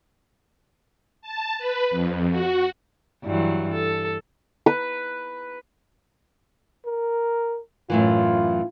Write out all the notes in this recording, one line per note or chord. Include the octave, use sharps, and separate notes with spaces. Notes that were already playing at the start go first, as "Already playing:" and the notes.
A5
B4
F2
F#4
G2 E3 F#3
A4
B4
A#4
F#2 A2 E3 F4